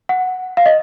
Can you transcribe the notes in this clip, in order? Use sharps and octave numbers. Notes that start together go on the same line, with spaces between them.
F#5
F5
D#5